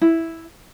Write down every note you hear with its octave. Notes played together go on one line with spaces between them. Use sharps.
E4